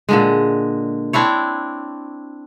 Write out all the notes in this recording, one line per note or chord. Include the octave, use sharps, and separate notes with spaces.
A#2 D3 G#3
C4 D4 E4 C#5